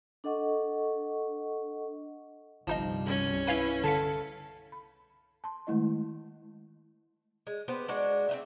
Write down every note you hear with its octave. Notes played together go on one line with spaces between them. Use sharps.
D4 A4 D#5 F#5 C#6
G1 C2 G2 F3 G3 D#4 D#5
C#4
E4 B4 C#5 F5 G#5
D3 A4 F5 B6 C#7
B5
A5 C6
D#3 G#3 A3 E4 D#5
G#3
B3 G4 B4 C5
G#3 D4 F#4
C4 D#4 E5